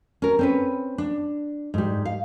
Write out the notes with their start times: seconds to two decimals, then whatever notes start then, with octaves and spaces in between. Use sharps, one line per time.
0.22 C#4 A#4
0.39 C4 C#4 B4
0.98 D4
1.74 G#2 G3
2.05 F5